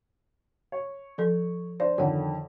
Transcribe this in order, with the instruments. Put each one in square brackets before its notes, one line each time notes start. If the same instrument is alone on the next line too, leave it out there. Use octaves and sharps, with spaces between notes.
[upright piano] C#5
[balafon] F3 A4
[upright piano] D4 C5 [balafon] D5
[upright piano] F2 D3 D#3 [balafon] C#5 F#5